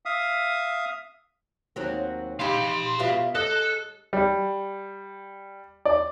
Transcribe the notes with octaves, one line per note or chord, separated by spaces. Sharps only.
E5 F5 D#6
D#2 F#3 C4
D#4 G4 F5 B5 C6
B2 G3 F4 E5
A4 D#5 F#6
G3
D5